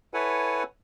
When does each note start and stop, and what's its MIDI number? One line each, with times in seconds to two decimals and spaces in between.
0.14 0.63 64
0.14 0.63 69
0.14 0.63 71
0.14 0.63 73
0.14 0.63 78
0.14 0.63 80